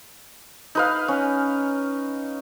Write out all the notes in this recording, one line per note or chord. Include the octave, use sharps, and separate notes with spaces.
D#4 B4 F5
C#4